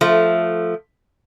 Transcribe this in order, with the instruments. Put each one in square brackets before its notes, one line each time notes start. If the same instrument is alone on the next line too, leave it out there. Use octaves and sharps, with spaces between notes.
[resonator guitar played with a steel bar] F3 A3